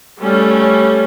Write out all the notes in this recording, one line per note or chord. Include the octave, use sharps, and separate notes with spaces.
G3 A3 C#4